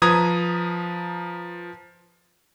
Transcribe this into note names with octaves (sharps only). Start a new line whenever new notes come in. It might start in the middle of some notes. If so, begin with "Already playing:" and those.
F3 B4 A#5 D#6 G#6